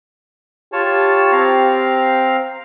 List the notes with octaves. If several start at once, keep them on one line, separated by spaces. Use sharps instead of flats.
F4 G4 C#5 A5
C4 F5 A#5